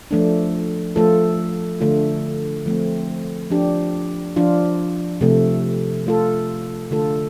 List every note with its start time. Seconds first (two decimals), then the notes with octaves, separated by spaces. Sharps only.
0.11 F3 A3 D4
0.96 F3 A3 F4 A4
1.80 D3 A3 F4
2.66 F3 A3 C4
3.50 F3 D4 G4
4.36 F3 D4 F4
5.21 C3 F3 A3
6.07 A3 F4 A4
6.91 D3 A3 F4 A4